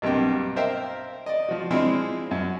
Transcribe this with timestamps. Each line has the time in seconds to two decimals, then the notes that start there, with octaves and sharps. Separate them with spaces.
0.02 B1 G2 C3 A#3 G5
0.56 A#4 C5 E5 F5 G5
1.26 D5 D#5
1.49 F3 F#4
1.71 F3 G#3 C4 D4 E4
2.31 F#2